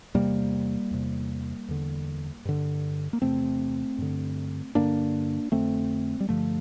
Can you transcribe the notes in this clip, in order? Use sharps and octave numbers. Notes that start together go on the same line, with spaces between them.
E2 C3 G3 A#3
E2 C3
E2 D3
G2 D3
A#3
E2 C3 A3 C4
G2 D3
G2 D3 A#3 D4
F2 D3 A3 C4
G3
G2 D3 F3 A3